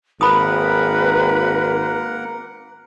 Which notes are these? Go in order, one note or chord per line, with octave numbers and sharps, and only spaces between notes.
G#1 A#3 A#4 B4 F#5 B5 D#6